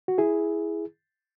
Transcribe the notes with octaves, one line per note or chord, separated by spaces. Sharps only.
F#4
E4 G#4